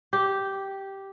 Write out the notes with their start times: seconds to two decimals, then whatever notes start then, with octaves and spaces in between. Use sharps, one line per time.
0.13 G4